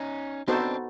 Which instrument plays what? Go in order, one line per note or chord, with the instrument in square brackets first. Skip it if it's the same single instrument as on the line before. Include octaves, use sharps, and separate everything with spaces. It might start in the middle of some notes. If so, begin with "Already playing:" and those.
Already playing: [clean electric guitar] C#4 D#4
[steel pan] B3 D#4 F#4 A4 C5 [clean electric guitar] C4 D4